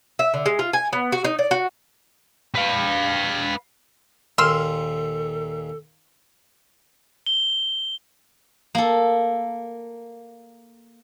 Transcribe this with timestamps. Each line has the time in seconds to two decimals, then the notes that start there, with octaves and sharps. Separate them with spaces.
0.19 E5
0.34 D3
0.46 G#3
0.59 F4
0.73 G#5
0.93 B3
1.12 F#4
1.24 D#4
1.39 D5
1.51 F#4
2.55 B4 F5
4.38 D#2 A#2 A4 C6 E6 F6
7.26 G7
8.75 A#3 A4